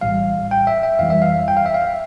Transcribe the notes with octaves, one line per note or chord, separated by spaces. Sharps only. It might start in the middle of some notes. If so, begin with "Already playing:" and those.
A#1 A2 E3 G3 F5
G5
E5
E5
F2 E3 G3 F5
E5
F5
G5
F5
E5
F5